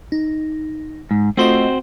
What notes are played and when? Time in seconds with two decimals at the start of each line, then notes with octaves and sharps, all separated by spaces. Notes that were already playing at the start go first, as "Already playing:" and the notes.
0.12 D#4
1.11 G#2
1.37 A3 C4 F4 F#4 C5 D#5